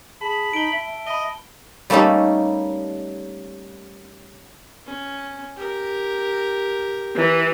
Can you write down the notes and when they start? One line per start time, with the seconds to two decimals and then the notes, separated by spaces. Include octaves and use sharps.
0.21 G#4 A5 B5
0.53 D#4 D7 G7
0.72 E5
1.07 D#5 B5 G7
1.90 G3 A3 A#3 C#4 D#4 A4
4.86 C#4
5.56 G4 A#4
7.16 E3